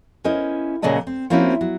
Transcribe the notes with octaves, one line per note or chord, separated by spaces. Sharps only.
C#4 E4 A#4 C5 D#5
A#2 C#3 F#3 D5 D#5 A5
C4
F3 A#3 C4 C#4 E4 F#4
F#3